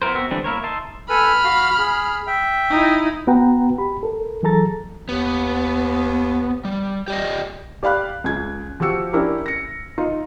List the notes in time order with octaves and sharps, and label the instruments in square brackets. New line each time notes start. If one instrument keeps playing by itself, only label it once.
[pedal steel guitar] B3 E4 F#4 A#4 C5
B3 C4 F#4 E5
D3 E3 G3 C4 D4
A#3 E4 A#4 C#5
D#4 E5 A5 C6
[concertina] A4 B4 G#5 [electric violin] B5 F6
[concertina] F#4 F5
G#4
E5 G5
[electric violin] D#4 E4
[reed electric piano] B3 F#4 B4 F#5 G5 A#5
G4 B5
A4 A#4
E3 F#3 G#4 A4 A#5 A6
[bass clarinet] D#2 [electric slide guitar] B3
[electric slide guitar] G3
G4 D5 D#5
[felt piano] G4 D5 F5 B5 F#6
C#2 G#4 G#6
F3 F#4 G4 E6 C#7
C#4 D4 E4 G4 A#4
A#6 C#7
D#4 F4